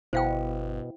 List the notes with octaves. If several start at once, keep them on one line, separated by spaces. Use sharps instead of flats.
G1 B2 E4 C5 F5 G5